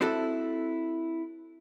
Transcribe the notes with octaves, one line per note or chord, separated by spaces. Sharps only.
C4 E4 F#4 A4